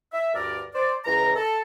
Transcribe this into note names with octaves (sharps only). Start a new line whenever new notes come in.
E5
D2 G2 A#4 D5
C5 D5
C#2 E3 A#5
A4